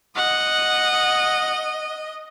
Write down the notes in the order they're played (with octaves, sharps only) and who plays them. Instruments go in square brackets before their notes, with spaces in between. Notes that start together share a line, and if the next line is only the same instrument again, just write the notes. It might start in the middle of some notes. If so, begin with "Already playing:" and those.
[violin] D#5 [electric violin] F#5